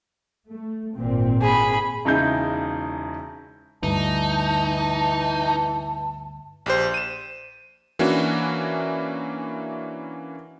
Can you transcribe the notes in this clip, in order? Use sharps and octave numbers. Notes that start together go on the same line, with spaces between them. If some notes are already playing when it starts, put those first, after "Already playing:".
A3
G#1 A#2 C4
G#4 B5
E1 C#3 D#4 E4 G#4 G6
D2 G2 E3 D#4 A5
A#1 G4 C5
D#7 E7
E3 A#3 C#4 D4 E4 F#4